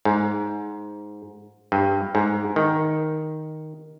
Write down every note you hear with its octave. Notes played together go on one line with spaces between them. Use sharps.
G#2
G2
G#2
D#3